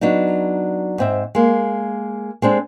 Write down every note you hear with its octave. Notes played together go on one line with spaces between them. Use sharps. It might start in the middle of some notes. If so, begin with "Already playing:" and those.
F#3 B3 D4 D#4
G#2 C4 E5
G#3 A#3
G#3 C4 D4 A4